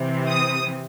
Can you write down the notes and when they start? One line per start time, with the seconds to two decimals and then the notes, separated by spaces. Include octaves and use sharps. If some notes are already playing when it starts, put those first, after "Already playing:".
Already playing: C3 E3 C4
0.28 D#6